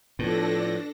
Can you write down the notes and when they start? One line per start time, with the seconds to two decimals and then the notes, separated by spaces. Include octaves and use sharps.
0.19 A2 F3 B3 D4 A4 A#6